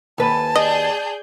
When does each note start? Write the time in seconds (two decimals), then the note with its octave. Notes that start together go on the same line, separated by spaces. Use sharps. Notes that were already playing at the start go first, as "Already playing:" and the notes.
0.18 D#2 B4 G#5 A5
0.56 G#4 D5 D#5 G6